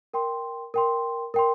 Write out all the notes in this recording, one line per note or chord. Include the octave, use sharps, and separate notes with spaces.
A#4 G5 C6
A#4 G5 C6
A#4 G5 C6